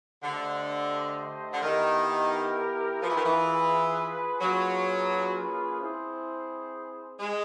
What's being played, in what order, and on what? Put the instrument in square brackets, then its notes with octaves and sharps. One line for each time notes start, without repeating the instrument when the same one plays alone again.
[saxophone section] D3 [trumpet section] A3 D4 G4 C5 D#5
[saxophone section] D3
[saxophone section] D#3 [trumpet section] B3 E4 G4 A#4
[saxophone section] F3 [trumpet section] F4 G#4 B4
[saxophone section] E3
D#3
E3
[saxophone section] F#3 [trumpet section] A#3 C#4 F4 G#4 B4
[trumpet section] C4 E4 G#4 C5
[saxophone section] G#3